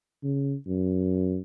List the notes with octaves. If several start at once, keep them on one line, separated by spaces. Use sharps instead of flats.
C#3
F#2